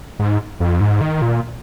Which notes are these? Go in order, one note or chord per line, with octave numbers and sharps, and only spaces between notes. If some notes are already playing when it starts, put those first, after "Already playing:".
G#2
F2
G#2
D#3
A#2